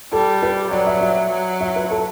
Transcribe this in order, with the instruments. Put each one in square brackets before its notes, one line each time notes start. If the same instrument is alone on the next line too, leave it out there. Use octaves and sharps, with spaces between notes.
[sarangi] G3 [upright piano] A4
[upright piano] B4
[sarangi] F#3 [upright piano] D5
[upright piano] E5
E5
[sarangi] F#3
[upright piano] E5
B4
A4